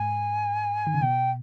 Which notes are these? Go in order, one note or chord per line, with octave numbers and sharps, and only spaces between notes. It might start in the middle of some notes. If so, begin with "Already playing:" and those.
Already playing: G#2 G#5
D#3
C#3
B2 G5